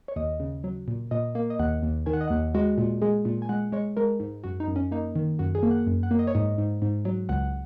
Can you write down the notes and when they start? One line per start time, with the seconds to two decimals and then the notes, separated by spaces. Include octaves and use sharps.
0.08 C#5
0.16 D#2 D#5
0.40 C#3
0.64 F#3
0.88 A#2
1.11 A#2 D#5
1.35 A#3
1.50 D#5
1.59 D#2 F#5
1.83 D#2
2.06 D#3 G#5
2.13 F#5
2.21 D#5
2.28 D#2 F#5
2.55 G#3 F#4
2.78 A#2
3.02 G#3 G#4
3.25 A#2
3.42 G#5
3.49 G#3 F#5
3.72 G#3 C#5
3.97 G#3 A#4
4.20 G#2
4.44 F#2 F#4
4.60 D#4
4.68 F#2
4.76 C#4
4.91 A#3 D#4
5.16 D#3
5.39 F#2 F#4
5.55 G#4
5.63 A#3
5.71 F#5
5.87 F#2
6.03 F#5
6.11 A#3
6.19 D#5
6.27 C#5
6.35 G#2 D#5
6.58 G#2
6.82 G#2
7.05 F#3
7.29 C#2 F#5